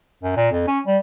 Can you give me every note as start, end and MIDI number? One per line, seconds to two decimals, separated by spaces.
0.23 0.35 42
0.36 0.50 46
0.51 0.63 41
0.68 0.79 61
0.86 0.98 55